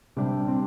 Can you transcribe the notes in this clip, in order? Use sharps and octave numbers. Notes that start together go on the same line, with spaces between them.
C3 G3 D4 G4
C4